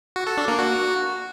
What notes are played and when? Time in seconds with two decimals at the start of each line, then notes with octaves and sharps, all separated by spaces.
0.16 F#4
0.27 A4
0.37 D4
0.48 A#3
0.59 F#4